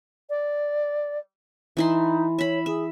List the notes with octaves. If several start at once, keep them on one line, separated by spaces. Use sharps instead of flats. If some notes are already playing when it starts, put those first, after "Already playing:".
D5
E3 D#4 E4 C6
C#5 E5 B5
G#4 E5